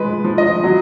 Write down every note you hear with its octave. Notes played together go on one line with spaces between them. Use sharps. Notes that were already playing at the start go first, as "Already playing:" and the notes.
Already playing: F3 G#3 B4
F3
D#5
F#3